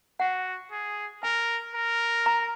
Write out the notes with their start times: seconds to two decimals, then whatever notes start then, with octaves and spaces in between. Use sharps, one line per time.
0.20 F#4 F#5
0.71 G#4
1.23 A#4 G#5
1.74 A#4
2.26 A#5